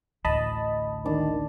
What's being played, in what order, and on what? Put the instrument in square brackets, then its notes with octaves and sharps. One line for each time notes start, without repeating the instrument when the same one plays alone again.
[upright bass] A1 D2 [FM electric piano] D#5 A5 B5
[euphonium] D#3 [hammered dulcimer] D4